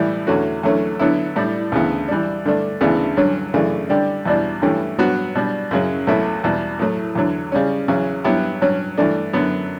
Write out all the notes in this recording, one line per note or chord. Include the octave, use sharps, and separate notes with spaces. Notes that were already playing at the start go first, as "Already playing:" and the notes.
Already playing: A2 E3 G3
E2 D3 A3 C#4 F#4
E2 D3 F#3 A3 C#4
D3 F#3 B3 E4
A2 G3 D4
D2 C#3 E3 B3
E3 G3 D4
G2 D3 A3 D4
D2 C#3 E3 B3 D4
G2 D3 F#3 C#4
F#2 C#3 E3 A3 D4
D3 G3 D4 G4
E2 B2 G3 D4
G2 E3 A3 C#4 G4
G2 F#3 B3 F#4
B2 G3 D4
F#2 C#3 F#3
C#2 B2 F#3 A3 E4
E2 B2 G3
A2 F#3 A3
E2 D3 F#3
C#3 G3 C#4
E2 C#3 F#3 C#4
G2 F#3 B3 E4 G4
G2 F#3 C#4
G2 E3 A3 D4
F#2 D3 F#3 B3